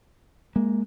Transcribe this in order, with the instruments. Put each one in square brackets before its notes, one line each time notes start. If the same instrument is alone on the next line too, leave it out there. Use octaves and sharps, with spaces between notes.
[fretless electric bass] G#3 A#3